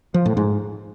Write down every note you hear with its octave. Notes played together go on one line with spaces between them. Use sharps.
F3
A2
G#2